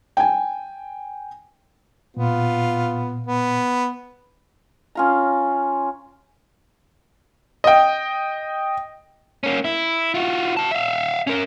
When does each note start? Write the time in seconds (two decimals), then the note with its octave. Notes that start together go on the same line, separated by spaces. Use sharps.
0.17 G5 G#5
2.17 A#2 B3 F4
3.27 B3
4.95 C#4 F4 A#5
7.64 D#5 G5
9.44 A#3 C#4
9.65 E4
10.14 F4 F#4
10.57 F#4 A5
10.71 E5 F5
11.27 C#4 A#4